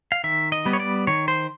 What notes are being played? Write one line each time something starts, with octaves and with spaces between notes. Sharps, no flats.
F5
D#3 E5
D#5
G3 B3
C#5
D5
D#3 C#5
C5